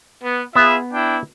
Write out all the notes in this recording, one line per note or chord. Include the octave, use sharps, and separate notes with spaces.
B3
B3 F4 G#4 E5
D4 E4 G5